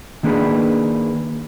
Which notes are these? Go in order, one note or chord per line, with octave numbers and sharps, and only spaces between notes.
D#3 A#3 D4 G#4 B4